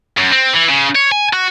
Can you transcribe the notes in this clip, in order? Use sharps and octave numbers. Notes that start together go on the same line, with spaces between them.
F#2
C4
E3
C#3
C#5
G#5
F#4